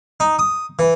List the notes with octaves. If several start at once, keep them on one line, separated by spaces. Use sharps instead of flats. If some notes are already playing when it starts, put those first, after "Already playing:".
D#4
D#6
E3